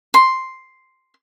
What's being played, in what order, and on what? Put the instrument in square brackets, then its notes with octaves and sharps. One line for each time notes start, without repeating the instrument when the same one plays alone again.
[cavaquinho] C6